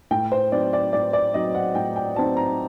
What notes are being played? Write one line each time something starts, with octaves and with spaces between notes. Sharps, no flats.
A2 G5
C5
F#3 C4 D#4 D5
D5
A2 D5
D5
F#3 C4 D#4 D#5
F#5
A2 G5
G5
F#3 C4 D#4 A5
A#5